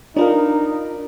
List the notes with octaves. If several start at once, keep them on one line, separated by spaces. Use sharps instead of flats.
D4 D#4 F4 A#4 B4 D5